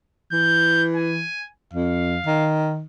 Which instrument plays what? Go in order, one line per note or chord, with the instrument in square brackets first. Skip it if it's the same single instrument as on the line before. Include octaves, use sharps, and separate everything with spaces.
[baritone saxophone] E3 [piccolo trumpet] G6
[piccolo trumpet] G#5
[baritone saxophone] F2 [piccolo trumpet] F5
[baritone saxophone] D#3